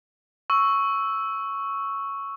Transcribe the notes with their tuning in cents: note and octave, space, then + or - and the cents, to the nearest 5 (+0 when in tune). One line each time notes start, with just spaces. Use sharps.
C#6 +0 E6 +0